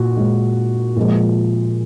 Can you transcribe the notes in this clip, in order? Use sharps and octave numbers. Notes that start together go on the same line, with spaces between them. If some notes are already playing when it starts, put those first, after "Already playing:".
Already playing: A#2 F#4
A#2 G#3
A#2 F3 G#3